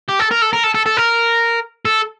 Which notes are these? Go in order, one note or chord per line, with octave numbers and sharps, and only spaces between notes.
G4
A4
A#4
A4
A#4
A4
A4
A4
A#4
A4